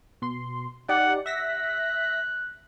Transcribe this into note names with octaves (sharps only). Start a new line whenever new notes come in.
B2 C6
D#4 G4 D5 F#5
E5 F#6 A#6 B6